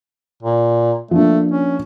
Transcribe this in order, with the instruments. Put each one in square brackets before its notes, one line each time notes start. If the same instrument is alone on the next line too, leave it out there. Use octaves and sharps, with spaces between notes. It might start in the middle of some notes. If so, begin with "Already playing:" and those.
[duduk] A#2
[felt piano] F3 A#3 D4 [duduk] A3
[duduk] C#4